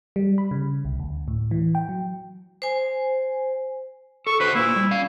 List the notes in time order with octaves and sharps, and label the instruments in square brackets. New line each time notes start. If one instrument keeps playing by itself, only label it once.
[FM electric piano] G3
B5
C#3
C2
D2
A2
E3
G5
F#3
[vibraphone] C5 G#5
[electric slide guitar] A4 [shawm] C#6
[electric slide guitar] D3 F#4 C5 [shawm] B4
[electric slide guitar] A#3 F4 [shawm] E4
[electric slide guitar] G3
C#4 F5